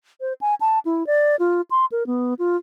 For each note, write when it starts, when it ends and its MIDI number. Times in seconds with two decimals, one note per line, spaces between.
0.21 0.33 72
0.41 0.55 80
0.61 0.79 81
0.85 1.06 64
1.07 1.36 74
1.39 1.61 65
1.71 1.85 84
1.92 2.06 70
2.07 2.34 59
2.39 2.57 65